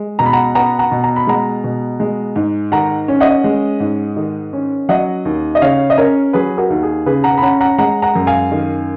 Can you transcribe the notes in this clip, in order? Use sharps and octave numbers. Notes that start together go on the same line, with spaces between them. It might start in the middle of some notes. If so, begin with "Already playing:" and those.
Already playing: G#3
B2 A#5
B5
F#5 A#5
B3 F#5 A#5
F#5 A#5
B2
A#5
B5
G#3 F#5 A#5
B2
G#3
G#2
D#3 F#5 A#5
C#4
D#5 F#5
G#3
G#2
D#3
C#4
F#3 D#5 F#5
D#2
D#5
C#3 C#5 F5
D#5
C#4 A#4 C#5
F#3 G#4 B4
F#4 A#4
D#2
G#4
C#3 G#4 B4
F#5 A#5
B5
C#4 F#5 A#5
F#5 A#5
G#3 F#5 A#5
F#5 A#5
F#2
F5 G#5
D#3